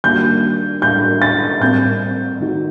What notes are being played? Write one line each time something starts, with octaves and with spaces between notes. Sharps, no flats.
D#3 G3 A#3 D4 F#4 G6
A2 G3 D4 F#4 G6
A6
A2 G3 C4 G6
D#3 A3 D#4 F#4